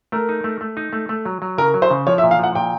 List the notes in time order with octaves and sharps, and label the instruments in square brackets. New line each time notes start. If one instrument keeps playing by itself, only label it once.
[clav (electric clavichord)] A3 [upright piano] A#4
[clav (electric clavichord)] D#4
A3
A3
D#4
A3
A3
F#3
F#3
[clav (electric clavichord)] C#3 [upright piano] A#4
[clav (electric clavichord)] F#3
[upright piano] C5
[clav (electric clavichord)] C#3
[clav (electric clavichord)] F3 [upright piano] C#5
[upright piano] E5
[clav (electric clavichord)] A#2
[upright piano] F5
[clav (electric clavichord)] F3 [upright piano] F#5
[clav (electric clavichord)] A#2 [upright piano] G5